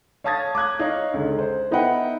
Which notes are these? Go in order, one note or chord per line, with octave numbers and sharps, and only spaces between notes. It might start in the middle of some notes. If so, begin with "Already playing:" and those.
C#5 F5 A5 D#6 G#6 A6
D6 D#6 F#6 G#6
D#4 C#5 F5
C#2 D3
C5
B3 D#4 E4 B4 F#5 G5